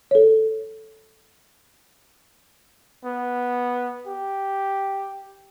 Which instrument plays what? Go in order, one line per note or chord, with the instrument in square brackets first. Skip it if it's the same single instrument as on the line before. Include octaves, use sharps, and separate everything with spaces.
[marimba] A4 C#5
[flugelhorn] B3
G4